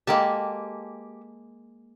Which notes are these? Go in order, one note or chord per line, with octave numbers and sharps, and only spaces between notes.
G#3 A#3 G4 A4 G5 A5